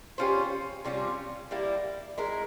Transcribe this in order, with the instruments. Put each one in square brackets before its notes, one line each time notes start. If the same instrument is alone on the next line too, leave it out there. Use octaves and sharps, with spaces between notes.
[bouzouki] G3 C#4 F4 C5
C3 G3 C#4 F4
G3 A#3 E4
G#3 E4 A#4